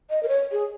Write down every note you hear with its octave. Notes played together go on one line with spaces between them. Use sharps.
D#5
A#4
C#5
G#4